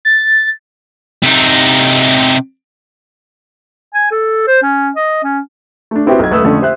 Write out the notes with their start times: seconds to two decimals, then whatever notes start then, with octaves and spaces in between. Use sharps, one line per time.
0.05 A6
1.23 C3 D#4
3.94 G#5
4.12 A4
4.47 C5
4.63 C#4
4.96 D#5
5.24 C#4
5.91 A3 D4
6.06 B3 C4 E4 F#4 G4
6.19 B1 G#6
6.31 D#1 A3 B4 D#6 E6
6.44 F2 D3 A3 C#4 D4
6.61 G4 C5 E5 F#6